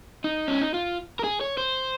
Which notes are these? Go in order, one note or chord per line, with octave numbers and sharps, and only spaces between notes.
D#4
C#4
D#4
F4
A#4
G#4
C#5
C5